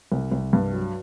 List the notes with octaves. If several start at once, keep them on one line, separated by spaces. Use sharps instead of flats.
C2
C2
G2
F#3